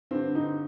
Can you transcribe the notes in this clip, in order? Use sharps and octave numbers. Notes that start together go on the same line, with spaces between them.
G2 D3 C4
D#4